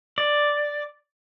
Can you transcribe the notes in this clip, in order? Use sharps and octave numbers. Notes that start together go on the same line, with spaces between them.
D5